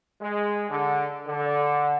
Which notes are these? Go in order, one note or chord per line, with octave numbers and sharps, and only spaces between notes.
G#3
D3
D3